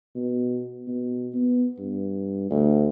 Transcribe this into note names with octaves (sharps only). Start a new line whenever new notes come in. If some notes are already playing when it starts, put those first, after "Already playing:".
B2
B2
B3
G2
D2